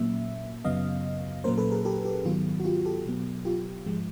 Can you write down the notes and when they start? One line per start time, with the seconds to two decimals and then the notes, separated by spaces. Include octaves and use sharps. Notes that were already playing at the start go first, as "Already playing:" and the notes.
Already playing: A#2 F#3 A#3 C#4 E5
0.65 F#2 C#3 F#3 B3 D#5 F5
1.44 A#2 F#3 A#3 C#4 A#4 C5
1.58 A4 B4
1.71 G#4 A#4
1.85 G4 A4
2.05 G4 A4
2.25 G#2 D#3 F#3 B3 F4
2.60 F#4
2.65 F4 G4
2.86 G4 A4
3.05 B2 F#3 B3
3.45 F4 G4
3.86 G#2 F3 G#3